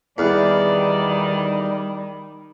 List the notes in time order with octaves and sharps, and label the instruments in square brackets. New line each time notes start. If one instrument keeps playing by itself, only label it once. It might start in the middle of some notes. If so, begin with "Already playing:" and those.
[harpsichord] E2 [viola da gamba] D#3 [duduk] G3 [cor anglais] D5